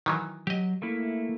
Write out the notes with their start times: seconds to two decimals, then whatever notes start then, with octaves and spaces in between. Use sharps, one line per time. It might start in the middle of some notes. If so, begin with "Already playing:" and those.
0.06 D#3 E3 F#3
0.47 F#3 G4 D#5
0.82 A3 A#3 E4